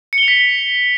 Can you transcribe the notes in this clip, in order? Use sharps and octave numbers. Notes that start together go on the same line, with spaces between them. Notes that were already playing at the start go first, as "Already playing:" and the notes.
C#7
G7
F7
B6